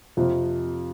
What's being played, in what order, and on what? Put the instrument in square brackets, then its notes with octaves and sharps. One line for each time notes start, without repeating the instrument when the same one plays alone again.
[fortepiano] F2 C3 F3